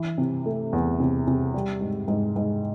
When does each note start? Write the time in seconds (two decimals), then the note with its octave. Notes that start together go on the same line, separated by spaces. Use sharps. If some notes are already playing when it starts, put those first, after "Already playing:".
Already playing: E3
0.18 C3
0.46 A3
0.73 E2
1.00 C3
1.27 C3
1.54 G3
1.81 G#2
2.08 G#2
2.36 G#2